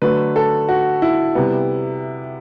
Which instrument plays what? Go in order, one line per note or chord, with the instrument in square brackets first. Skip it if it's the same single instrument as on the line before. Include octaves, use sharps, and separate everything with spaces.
[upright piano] D3 F#3 A3 B4
A4
F#4
E4
C3 G3 B3